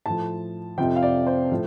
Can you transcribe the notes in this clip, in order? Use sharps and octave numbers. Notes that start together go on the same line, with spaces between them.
A2 F3 A5
F2 C3 F3 G5
F5
D5
C5
A2 F3